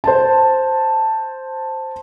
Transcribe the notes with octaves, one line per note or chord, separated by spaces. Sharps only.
C5 A5